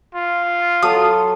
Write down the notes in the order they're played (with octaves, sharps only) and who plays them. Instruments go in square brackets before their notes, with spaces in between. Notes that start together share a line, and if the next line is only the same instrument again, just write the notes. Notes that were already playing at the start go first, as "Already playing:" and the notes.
[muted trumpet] F4
[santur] F#3 A4 [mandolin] D#6